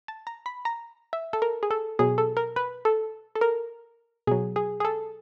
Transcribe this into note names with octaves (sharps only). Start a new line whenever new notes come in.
A5
A#5
B5
A#5
E5
A4
A#4
G#4
A4
B2 F#3 G#4
A4
A#4
B4
A4
A4
A#4
B2 F#3 G#4
G#4
G#4
A4